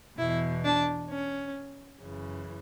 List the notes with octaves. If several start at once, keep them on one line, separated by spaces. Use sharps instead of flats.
E2 B2 E4
D4
C#4
F#2 C#3 E3